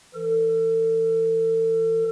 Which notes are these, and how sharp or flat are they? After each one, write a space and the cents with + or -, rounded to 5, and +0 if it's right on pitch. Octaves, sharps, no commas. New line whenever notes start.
E3 +15 A4 +40